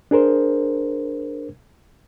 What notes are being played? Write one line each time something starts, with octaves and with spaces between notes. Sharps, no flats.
D4 G#4 A#4 C5